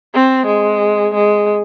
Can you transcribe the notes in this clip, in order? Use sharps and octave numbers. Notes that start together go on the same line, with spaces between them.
C4
G#3
G#3